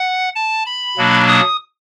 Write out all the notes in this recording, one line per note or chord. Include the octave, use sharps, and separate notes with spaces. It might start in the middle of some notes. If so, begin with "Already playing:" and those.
Already playing: F#5
A5
B5
B2 F#3 A#3 D4
D#6